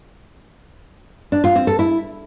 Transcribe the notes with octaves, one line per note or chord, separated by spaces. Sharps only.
D4
F4
C4
A4
E4